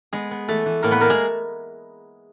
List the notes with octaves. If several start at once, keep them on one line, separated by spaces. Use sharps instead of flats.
G#3 B3 G#4
B3
E3 A3 A4
E3
A2 A#3 A#4
B3 B4
A3 A#3 A#4
G#3 G#4